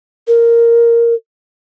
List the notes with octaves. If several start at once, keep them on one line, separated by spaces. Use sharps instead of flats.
A#4